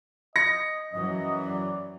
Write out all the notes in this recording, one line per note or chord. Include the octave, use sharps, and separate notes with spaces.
D#5 A#6 C#7
F#2 E3 F#3 D#5
D5